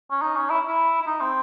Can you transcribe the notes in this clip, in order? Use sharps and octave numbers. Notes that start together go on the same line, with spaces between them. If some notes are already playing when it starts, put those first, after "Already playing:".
C#4
D#4
C#4
E4
E4
E4
D#4
C4